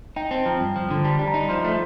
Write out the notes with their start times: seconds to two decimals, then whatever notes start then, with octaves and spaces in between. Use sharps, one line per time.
0.16 D#4 G5
0.31 C4 A5
0.46 F3 A#5
0.60 G2 G5
0.76 F3
0.91 D3
1.04 G3 A5
1.19 G3
1.28 A#5
1.34 D#4
1.49 F3 C6
1.65 A3